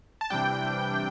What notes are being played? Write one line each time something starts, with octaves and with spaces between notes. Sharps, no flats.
A5
C3 E3 G3 D4 G5
C3 E3 G3 D4
C3 E3 G3 D4